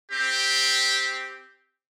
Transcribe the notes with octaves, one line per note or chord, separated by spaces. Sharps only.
C4 G4